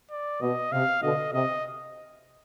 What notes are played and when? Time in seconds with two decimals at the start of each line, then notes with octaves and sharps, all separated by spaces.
0.11 D5
0.41 B2 D#5
0.72 C3 F5
1.02 B2 D3 D#5
1.33 C3 D#5